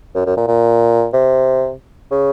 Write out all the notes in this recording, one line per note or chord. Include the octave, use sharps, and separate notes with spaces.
F#2
F#2
A#2
A#2
C3
C#3